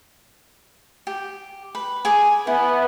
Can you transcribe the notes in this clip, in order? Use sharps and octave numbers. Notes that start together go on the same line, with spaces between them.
G4
B4
G#4 G#5 D6
B3 E4